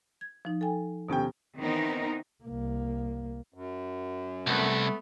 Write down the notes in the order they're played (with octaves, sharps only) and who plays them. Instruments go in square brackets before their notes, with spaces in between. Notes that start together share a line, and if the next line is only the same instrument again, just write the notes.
[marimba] G#6
F3 D#4
A4 G5 G#5
[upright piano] D#1 C#4 G5 [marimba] B2 B3 G4
[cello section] D#3 E3 B3 C4 D#4 A#4
[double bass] C2 A#3
[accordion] F#2
[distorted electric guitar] C2 [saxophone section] A3 B3